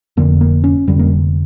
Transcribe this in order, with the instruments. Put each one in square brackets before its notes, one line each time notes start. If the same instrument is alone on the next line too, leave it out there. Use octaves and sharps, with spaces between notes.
[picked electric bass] F1 F2 D3 A#3
A#3
C#4
F1 F2 D3 G3
A#3